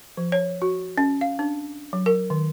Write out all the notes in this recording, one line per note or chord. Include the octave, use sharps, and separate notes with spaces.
F3
C#5
F#4
C#4
F5
D4
F#3
A#4
D#3